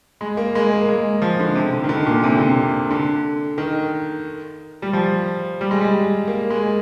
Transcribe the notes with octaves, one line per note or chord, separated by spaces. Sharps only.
G#3
A#3
G#3
A#3
G#3
F3
D3
C3
D3
D#3
D3
A#2
C3
D3
C3
D3
D#3
G3
F3
G3
G#3
G3
A#3
G#3